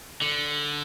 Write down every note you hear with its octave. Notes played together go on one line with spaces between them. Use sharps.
D3